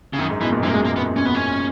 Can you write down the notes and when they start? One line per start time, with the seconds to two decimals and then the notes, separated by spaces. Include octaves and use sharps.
0.13 C#3
0.19 F#2 D#3
0.30 G#2
0.41 B2 E3
0.52 A#2
0.63 F#2 E3
0.69 A#3
0.74 G#3
0.85 E2 A#3
0.96 B3
1.16 C#4
1.25 B3
1.35 C#4